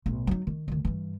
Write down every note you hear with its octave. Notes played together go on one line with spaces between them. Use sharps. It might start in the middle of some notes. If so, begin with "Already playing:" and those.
B1 A2
F#3 D#4
D#3
D2 D#3
G2 E3